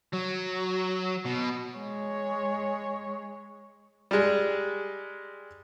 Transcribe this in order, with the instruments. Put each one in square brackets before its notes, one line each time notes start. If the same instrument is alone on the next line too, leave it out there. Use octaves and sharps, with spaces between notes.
[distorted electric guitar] F#3
B2
[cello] G#3 C#5
[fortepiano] G3 G#3